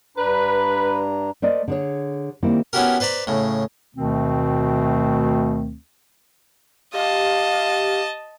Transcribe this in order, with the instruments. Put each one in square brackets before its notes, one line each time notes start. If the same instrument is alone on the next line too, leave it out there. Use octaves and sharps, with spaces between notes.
[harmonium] G2 D4 A#5 [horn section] B4
[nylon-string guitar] A3 A#4 C5 D5 D#5
D3 G#4 C#5
D#3 G3 A#3 C4 E4
[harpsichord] B3 C#4 E4 F#4 G4 A#4
B4 C5 D5 A#5 B5
A2 C#3
[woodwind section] D2 B2 D#3 A3 C4
[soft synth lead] G4 [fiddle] D#5 A5 [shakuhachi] F5